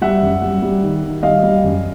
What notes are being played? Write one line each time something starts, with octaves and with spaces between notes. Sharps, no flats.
G3 E5 F#5
F#2
G3
G3
D#3
D#3
G3 D#5 F5
G3
F#2